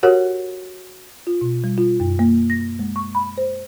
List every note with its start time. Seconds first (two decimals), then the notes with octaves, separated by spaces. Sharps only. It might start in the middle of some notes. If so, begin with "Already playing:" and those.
0.03 F#4 G4 A#4 C#5 F#5
1.27 F4
1.41 B2
1.64 G3
1.78 F4
2.00 F#2
2.19 A#3
2.50 A#6
2.79 G#3
2.96 C#6
3.15 B5
3.38 C5